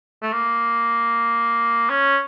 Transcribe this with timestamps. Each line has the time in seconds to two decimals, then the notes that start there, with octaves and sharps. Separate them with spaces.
0.22 A3
0.32 A#3
1.90 C#4